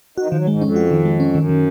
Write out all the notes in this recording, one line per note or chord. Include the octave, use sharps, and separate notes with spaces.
D#3 F#4
F3
D#3 F#3
G#2 G#3
F2 C#4
F#4
D#3
G#3
C#4
F#2 D#3
D#3